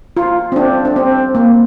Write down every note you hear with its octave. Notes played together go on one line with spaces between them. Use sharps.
F4
C4
D4
D4
C4
A#3